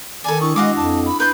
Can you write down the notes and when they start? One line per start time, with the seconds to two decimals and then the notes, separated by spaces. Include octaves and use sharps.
0.24 D#3 A4 D5 G#5
0.41 D4 E4 C#6 D#6
0.56 G#3 F#4 D#5 F5 D6
0.76 F2 A5
1.05 B5
1.20 B4 C6 G6